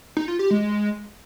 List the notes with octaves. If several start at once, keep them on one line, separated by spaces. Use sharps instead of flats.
D#4
F4
G4
G#3